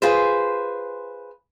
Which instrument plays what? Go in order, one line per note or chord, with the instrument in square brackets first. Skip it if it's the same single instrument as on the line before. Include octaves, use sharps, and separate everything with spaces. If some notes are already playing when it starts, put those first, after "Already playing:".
[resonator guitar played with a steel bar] F4 G#4 B4 C5